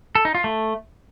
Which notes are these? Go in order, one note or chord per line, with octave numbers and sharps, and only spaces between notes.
A4
D#4
F4
A3